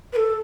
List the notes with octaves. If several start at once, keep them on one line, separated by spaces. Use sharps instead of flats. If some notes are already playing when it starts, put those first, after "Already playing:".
B4
A4